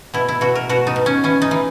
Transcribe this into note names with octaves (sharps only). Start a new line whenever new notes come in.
B2 E4
E4
B2 F#4
A#4
B2 F#4
D#4
B2
C#4
E3 C#4
D#4
E3